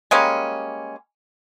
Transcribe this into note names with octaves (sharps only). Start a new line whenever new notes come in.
G3 G#3 A#3 C#4